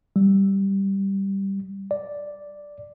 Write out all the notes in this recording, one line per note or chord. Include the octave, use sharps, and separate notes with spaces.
G3
D5